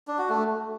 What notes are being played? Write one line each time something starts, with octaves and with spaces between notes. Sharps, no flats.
D4
F#4
A3